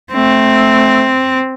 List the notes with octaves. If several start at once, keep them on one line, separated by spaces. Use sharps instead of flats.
A3 C4